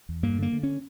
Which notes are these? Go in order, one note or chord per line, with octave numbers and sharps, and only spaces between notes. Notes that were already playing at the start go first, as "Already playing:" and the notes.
E2
G2 A#3
D3 A#3
D3
C#4